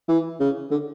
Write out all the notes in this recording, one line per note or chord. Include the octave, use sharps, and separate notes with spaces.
E3
C#3
D3